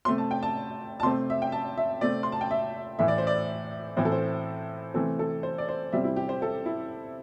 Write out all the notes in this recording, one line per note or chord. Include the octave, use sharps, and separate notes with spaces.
C3 A3 C4 C6
A5
G5
A5
A5
C3 A3 C4 C6
E5
G5
A5
E5
C3 A3 C4 D5
C6
A5
G5
E5
A2 E3 A3 E5
D5
C5
D5
A2 E3 C4 C5
A4
C5
C3 E3 A3 C4 A4
A4
C5
D5
C5
C3 G3 C4 E5
E4
G4
C5
A4
E4